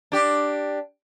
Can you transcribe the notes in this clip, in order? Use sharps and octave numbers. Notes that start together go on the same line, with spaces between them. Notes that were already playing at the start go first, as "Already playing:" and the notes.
D4 G4